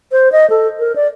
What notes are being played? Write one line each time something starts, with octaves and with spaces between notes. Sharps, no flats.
C5
D#5
A4
A#4
D5